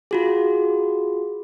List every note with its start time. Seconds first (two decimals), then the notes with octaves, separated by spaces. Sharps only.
0.11 F4 F#4 G#4